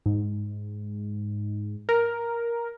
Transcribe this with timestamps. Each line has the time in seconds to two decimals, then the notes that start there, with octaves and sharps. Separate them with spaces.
0.06 G#2
1.89 A#4